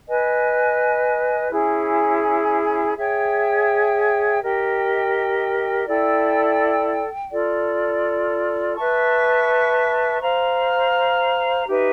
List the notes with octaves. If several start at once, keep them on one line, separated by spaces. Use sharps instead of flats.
B4 D#5 G#5
C#4 E4 G#4
G#4 C#5 E5 G5
G4 A#4 D#5 G5
E4 A4 D5 G5
F4 A4 D5
B4 E5 A5 C#6
C5 F5 A#5
D#4 G4 B4 E5